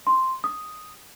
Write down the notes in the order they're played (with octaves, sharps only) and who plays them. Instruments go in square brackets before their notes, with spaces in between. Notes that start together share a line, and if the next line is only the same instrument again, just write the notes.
[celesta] C6
D#6